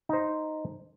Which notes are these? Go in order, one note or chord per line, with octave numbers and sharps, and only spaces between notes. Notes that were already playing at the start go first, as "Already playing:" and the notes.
D#4 C5